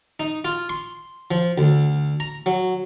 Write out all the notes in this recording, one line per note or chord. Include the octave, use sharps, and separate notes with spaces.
D#4
F4
C6
F3
D2
A#5
F#3